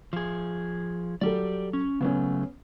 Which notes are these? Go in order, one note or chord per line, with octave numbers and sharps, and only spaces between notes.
F3 G#4
F#3 G4 A4 D5
C#4
C#3 F#3 A3 B3 C#4